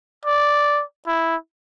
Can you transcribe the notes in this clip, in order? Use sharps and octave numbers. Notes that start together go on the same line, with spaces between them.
D5
E4